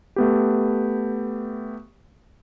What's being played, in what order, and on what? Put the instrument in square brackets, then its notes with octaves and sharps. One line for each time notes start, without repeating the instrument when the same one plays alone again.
[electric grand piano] A3 B3 G4